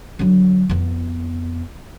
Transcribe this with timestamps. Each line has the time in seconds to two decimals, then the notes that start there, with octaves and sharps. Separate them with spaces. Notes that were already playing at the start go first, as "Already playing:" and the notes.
0.19 D3 F#3
0.69 F2 B3